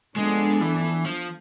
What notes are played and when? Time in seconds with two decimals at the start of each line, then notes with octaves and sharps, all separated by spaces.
0.16 F3 G#3 B3 D4 A4
0.61 E3
1.05 F3